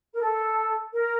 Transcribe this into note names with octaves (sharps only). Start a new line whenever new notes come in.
A#4
A4
A#4